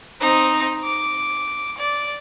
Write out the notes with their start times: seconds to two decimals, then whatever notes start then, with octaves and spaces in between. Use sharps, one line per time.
0.21 C4 D#4
0.84 D6
1.78 D5